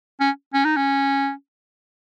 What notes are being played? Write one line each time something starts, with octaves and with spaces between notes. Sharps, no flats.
C#4
C#4
D#4
C#4